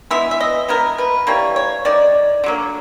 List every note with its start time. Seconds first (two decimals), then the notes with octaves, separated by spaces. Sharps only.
0.11 E3 G#3 B3 E5
0.31 E5
0.40 D#5
0.68 B2 G#3 B3 A#4
0.98 B4
1.27 E3 G3 A#3 C#5
1.56 C#5
1.85 D#3 G#3 D5
2.44 D3 F#3 A#3